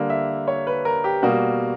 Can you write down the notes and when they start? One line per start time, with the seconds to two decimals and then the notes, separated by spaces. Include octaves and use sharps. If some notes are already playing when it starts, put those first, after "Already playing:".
Already playing: D3 G3 A#3
0.10 E5
0.48 C#5
0.67 B4
0.85 A#4
1.04 G4
1.23 B2 G3 A#3 F#4